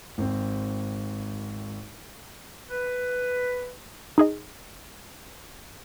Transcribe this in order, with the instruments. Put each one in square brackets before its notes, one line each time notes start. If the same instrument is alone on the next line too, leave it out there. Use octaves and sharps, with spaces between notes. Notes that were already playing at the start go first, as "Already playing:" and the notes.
[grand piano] G#1 C4
[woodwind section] B4
[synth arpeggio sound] D#4 G#4 D#5